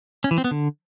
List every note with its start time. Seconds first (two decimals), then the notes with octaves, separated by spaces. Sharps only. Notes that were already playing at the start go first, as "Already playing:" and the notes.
0.24 C#4
0.31 E3
0.38 C4
0.44 B3
0.51 D3